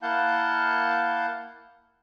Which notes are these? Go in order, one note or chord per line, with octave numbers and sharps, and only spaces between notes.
A#3 E4 F5 F#5 A5 G6